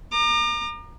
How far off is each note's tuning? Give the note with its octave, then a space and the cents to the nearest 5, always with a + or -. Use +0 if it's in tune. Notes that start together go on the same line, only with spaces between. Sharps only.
A#5 +0 D6 +45